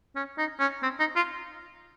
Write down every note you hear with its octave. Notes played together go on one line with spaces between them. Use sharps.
C#4
D#4
C#4
C4
D#4
F4